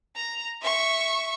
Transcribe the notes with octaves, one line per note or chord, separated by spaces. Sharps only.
A#5
E5 C#6